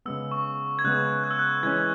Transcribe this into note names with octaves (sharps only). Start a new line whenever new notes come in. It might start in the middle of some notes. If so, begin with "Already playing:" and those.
C#3 G#3 B3 E6
C#6
G#6
C#3 G#3 B3 F#6
F#6
E6
F#6
E3 G#3 C#4 G#6